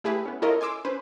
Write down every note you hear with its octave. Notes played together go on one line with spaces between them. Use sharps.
A3 E4 G4 G#4 B4
B3 C#4
E4 F4 A4 A#4 C#5 D#5
G#5 C6 D6 E6
C#4 B4 C5